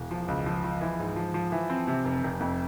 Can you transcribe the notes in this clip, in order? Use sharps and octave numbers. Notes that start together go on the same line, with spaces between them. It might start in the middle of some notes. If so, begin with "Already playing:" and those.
Already playing: E1
F3
C#2
F3
F3
E3
G#2
F3
F3
E3
C4
C3
F1
F1
F2